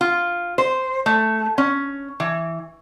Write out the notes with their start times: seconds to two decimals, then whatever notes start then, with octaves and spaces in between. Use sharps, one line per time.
0.01 F4
0.58 C5
1.06 A3
1.58 C#4
2.20 E3